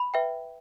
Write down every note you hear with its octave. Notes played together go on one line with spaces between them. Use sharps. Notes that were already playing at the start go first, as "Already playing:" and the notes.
Already playing: B5
B4 E5 G5